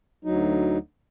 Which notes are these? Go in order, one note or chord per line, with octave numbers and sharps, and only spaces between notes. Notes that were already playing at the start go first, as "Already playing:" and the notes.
D2 F#3 D#4